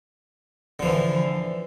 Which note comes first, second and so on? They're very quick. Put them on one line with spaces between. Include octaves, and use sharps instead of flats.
D3 F3 E3